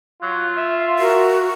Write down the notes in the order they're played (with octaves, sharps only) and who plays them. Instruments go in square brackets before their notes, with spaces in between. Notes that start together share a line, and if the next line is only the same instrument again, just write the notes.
[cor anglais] F#3 [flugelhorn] F4
[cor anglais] E5
[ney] F#4 [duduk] A#4